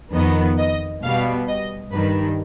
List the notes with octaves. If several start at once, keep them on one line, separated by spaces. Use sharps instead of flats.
F2 D#3 B3 D#5
D#5
B2 G3 B3 F5
D#5
G2 D#3 G3 B4